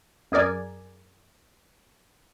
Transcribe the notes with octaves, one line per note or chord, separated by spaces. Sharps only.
F#2 G#4 A#4 D5 G#5